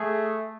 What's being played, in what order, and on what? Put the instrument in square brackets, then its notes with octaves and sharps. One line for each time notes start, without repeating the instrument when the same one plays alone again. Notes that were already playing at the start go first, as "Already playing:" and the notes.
Already playing: [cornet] A3 [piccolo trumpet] G#4